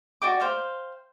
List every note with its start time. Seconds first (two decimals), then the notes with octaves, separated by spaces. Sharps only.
0.22 F#4 D5 G5 D6
0.40 C5 F5 G5